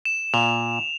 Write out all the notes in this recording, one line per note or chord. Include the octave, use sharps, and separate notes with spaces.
E7
A#2 F7